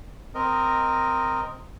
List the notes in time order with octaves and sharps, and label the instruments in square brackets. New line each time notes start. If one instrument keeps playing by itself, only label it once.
[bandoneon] C4 A#4 D#5